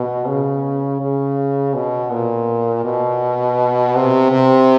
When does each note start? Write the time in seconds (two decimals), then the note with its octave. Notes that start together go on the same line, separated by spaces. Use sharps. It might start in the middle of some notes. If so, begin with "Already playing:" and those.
Already playing: B2
0.27 C#3
1.00 C#3
1.75 B2
2.11 A#2
2.84 B2
3.96 C3
4.32 C3